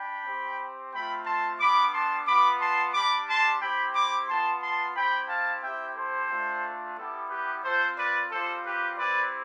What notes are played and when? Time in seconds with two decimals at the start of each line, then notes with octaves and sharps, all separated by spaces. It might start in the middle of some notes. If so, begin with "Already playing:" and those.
Already playing: D4 G5 B5
0.25 C4 G4
0.93 A3 C4 F4 G5 B5
1.26 A5 C6
1.59 G3 B3 D4 B5 D6
1.93 A5 C6
2.27 B3 F4 B5 D6
2.60 A5 C6
2.94 G3 D4 G4 B5 D6
3.28 A5 C6
3.61 C4 E4 G4 G5 B5
3.95 B5 D6
4.28 B3 F4 A5 C6
4.63 A5 C6
4.95 C4 E4 G4 G5 B5
5.29 F5 A5
5.63 C4 E4 G4 E5 G5
5.96 A4 C5
6.30 A3 D4 F4
6.97 G3 B3 E4 G4 A4
7.31 G4 B4
7.64 C4 F4 A4 C5
7.98 B4 D5
8.31 G3 C4 F4 A4 C5
8.65 G4 B4
8.98 C4 E4 G4 B4 D5